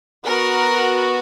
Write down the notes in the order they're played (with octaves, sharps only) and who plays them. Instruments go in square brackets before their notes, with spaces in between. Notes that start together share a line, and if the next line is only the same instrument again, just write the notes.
[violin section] B3 F#4 A#4